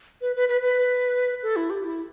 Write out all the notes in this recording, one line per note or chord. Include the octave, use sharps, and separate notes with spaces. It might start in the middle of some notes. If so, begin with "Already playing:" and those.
B4
B4
B4
B4
A4
E4
G4
E4